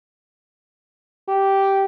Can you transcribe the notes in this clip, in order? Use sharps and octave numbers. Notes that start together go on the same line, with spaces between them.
G4